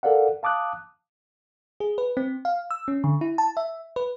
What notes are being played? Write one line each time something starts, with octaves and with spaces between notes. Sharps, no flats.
A4 A#4 D5 F5 F#5
F5 A5 D6 D#6 F#6
G#4
B4
C4
F5
E6
C#4
D3
E4
A5
E5
B4